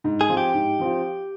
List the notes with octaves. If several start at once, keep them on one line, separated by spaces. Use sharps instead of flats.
G#2
G#4
F3 C4 F4
G4
G#2
F3 C4 F4